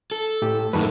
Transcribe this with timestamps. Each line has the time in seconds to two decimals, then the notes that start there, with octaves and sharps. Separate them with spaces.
0.11 A4
0.42 A2 G4
0.73 F#2 A2 D#3 A4 B4